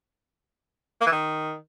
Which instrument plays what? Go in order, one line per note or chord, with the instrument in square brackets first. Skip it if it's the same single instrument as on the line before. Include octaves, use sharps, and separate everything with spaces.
[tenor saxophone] A#3
E3
D#3